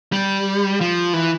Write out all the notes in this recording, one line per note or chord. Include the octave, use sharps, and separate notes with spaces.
G3
F3
E3